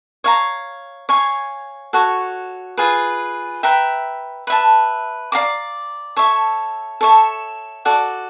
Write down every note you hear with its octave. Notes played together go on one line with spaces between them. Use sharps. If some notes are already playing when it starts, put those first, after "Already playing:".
C#5 F5 A#5
C#5 F5 G#5
F#4 A4 C#5
F4 G#4 B4
B4 E5 G5 A#5
B4 E5 A5
D5 F5 A#5 D6
A4 C#5 E5
A4 C#5 E5
F#4 A4 D5